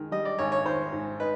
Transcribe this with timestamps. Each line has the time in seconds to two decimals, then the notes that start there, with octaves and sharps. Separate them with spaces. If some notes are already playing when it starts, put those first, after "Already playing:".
Already playing: D#3 G#3
0.12 G3 D#5
0.25 D5
0.39 G#1 C#5
0.52 C#5
0.65 D#3 C5
0.93 G#2
1.20 D#4 B4